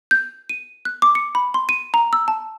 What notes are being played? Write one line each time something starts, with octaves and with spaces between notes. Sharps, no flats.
G6
D#7
F#6
D6
C#7
B5
C6
D#7
A#5
E6
A5